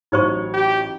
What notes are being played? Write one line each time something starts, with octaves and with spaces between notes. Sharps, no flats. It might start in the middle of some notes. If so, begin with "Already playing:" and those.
A1 F#3 D#4 C5 C#5 C#6
G4